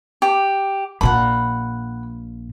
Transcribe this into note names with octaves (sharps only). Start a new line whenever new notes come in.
G4
A#1 A#2 F#5 B5